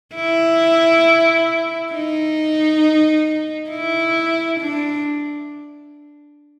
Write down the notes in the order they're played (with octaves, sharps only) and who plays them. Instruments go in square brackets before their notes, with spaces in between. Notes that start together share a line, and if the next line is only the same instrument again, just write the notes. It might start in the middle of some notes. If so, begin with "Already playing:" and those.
[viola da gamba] E4
D#4
E4
D4